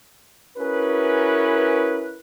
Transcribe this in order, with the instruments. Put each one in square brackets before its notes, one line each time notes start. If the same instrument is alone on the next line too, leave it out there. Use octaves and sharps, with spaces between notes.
[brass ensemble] C#4 E4 F#4 G#4 A#4 B4